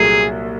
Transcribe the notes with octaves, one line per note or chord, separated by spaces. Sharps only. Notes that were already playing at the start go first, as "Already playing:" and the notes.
Already playing: C2 A#2 F#3 A3 G#4